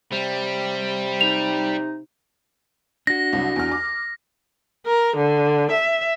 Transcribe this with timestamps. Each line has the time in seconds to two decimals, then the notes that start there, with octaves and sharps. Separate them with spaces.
0.12 C3 G3
1.21 D#4 F7
3.07 D4 F#4 A#6
3.33 C2 F#3
3.56 E2 F6
3.71 D6
4.86 A#4
5.16 D3
5.71 E5